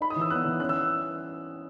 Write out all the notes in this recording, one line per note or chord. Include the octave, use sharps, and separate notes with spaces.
D#4 B5
D#6
E3
E6
B3 F#6
E3
C#4 F#6
E6